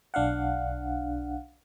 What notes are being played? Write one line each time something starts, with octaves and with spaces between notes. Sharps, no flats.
B1 D4 F5 F#5